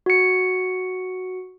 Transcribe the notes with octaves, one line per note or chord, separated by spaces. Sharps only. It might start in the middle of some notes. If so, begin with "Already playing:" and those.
F#4 C#7